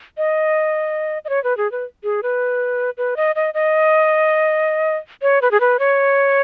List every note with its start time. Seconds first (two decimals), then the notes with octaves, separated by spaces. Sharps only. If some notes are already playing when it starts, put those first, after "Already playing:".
0.17 D#5
1.25 D#5
1.29 C#5
1.44 B4
1.57 G#4
1.72 B4
2.04 G#4
2.23 B4
2.98 B4
3.17 D#5
3.36 D#5
3.54 D#5
5.22 C#5
5.42 B4
5.51 G#4
5.60 B4
5.79 C#5